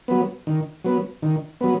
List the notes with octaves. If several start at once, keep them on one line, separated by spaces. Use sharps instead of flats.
F#3 B3
D#3
F#3 B3
D#3
F#3 B3